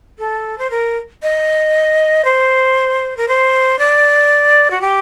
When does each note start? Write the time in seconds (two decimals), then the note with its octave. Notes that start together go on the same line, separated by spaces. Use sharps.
0.19 A4
0.58 C5
0.70 A#4
1.23 D#5
2.25 C5
3.17 A#4
3.28 C5
3.79 D5
4.71 F#4
4.81 G4